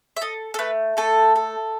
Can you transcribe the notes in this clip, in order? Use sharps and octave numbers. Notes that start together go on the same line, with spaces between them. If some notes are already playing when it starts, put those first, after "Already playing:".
E5
A4 D#5
A4
A3 B4
A3 A4
A4